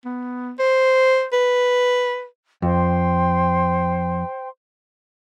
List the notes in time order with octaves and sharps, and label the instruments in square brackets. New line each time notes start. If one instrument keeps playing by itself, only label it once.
[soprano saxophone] B3
C5
B4
[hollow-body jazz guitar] F2 [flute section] C5 G5 C6